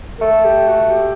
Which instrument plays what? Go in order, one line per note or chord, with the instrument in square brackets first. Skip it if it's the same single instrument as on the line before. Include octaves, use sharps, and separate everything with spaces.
[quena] A#4
[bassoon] A3 [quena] A4
[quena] G4
F#4
G4